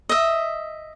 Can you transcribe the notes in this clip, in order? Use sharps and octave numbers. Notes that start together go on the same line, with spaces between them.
D#5 E5